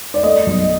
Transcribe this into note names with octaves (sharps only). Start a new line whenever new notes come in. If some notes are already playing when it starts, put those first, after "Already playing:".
D5
A3 D#5
B1